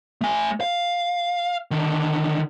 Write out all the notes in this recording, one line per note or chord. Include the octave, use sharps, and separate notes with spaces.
A3 G#5
F5
D3 D#3